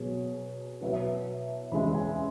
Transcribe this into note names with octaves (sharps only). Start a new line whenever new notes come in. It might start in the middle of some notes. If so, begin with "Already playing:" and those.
Already playing: B2 F#3 B3 G#4 C#5
B2 F#3 E4 B4 E5
E2 C#3 G#3 E4 B5
G#5